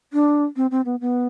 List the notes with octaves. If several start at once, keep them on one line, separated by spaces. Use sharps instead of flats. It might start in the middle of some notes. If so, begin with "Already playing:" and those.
D4
C4
C4
B3
B3